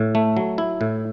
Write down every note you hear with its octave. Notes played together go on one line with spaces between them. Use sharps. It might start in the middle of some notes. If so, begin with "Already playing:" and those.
Already playing: A2
A3
F#3
E4
A2